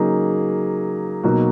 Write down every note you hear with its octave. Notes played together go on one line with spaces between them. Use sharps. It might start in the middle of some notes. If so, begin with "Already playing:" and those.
Already playing: C#3 F#3 A#3 D#4 G#4
B2 F#3 A#3 D#4 F#4